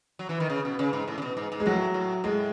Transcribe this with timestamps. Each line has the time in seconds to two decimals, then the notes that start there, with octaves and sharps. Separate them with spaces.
0.19 F#3
0.29 E3
0.40 D#3
0.50 C#3
0.65 B2
0.79 C#3
0.93 G#2
1.08 A2
1.18 C#3
1.22 B2
1.37 G#2
1.52 G#2
1.60 G#3
1.66 A2 F#3
1.94 A2
2.24 A2 G#3